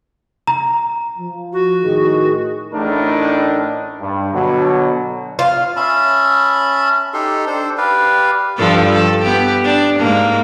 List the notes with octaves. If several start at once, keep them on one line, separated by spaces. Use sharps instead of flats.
A#5
F3
F#4
A2 D#3 G#4
A1 A2 A3 D4 D#4 A#4
G2
B2 D3 F#3
F4
C#4 E5 A5 B5
D#4 G4 A4 C6
D4 A4 C5
G4 B4 D5 F5
G2 F3 A4
A4
B3 G4
D4
G#2 A#3